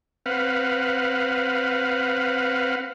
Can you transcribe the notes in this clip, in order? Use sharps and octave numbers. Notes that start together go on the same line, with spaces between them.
C4 B4 F5 F#5